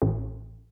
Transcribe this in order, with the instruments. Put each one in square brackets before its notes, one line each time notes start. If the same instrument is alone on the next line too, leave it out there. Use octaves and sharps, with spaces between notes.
[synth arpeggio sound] A1